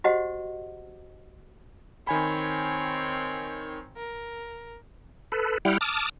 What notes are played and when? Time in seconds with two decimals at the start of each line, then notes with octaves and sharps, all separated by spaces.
0.04 F#4 G4 C5 D#5 F#5
2.07 D#3 C4 C#5 G#5 B5
3.96 A#4
5.32 A4 B4
5.65 G3 E4 F#5 G5 F6
5.81 A5 D6 D#6 F6